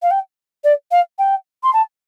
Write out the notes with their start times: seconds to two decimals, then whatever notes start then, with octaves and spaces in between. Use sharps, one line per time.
0.02 F5
0.11 G5
0.64 D5
0.91 F5
1.18 G5
1.63 C6
1.73 A5